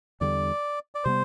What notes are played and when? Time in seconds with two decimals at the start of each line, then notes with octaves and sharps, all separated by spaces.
0.21 E2 D3 G3 D5
0.95 D5
1.04 C3 G3 B3 C5